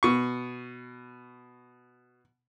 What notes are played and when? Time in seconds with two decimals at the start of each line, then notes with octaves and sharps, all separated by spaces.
0.03 B2 C#6